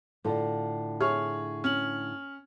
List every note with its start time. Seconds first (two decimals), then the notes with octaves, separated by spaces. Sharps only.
0.24 A2 D3 F4 A4 D5
1.00 G#4 C#5 E5 C#6 F6
1.64 C#4 F6 F#7